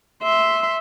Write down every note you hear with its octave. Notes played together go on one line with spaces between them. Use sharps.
E5 C6